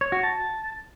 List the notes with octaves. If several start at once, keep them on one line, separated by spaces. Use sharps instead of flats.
C#5
F#4
A5